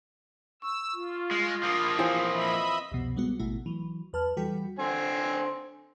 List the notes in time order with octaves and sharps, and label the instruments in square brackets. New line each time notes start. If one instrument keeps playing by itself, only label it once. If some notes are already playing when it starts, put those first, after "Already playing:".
[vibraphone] C#6 [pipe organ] E6
[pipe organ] F4
[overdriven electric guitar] G#3
[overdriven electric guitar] F3 A#3 [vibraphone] D#6
[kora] E3 C4 F4
[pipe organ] D#5 E5 B5
[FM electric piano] C2 F2 B2
G3 G#3 B3 F#4
A1 B2 A3 E4
E3 F#3
E2 B4 A5 F6
E3 G3 F#4 A4 G5 B6
[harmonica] D3 C4 G#5